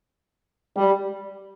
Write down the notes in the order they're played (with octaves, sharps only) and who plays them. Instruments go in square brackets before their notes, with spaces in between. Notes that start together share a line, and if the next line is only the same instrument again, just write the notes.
[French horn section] G3